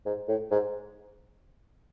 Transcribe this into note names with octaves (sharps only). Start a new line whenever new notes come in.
G#2
A2
G#2